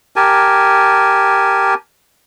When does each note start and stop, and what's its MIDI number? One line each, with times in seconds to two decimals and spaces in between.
0.16 1.74 67
0.16 1.74 70
0.16 1.74 80
0.16 1.74 81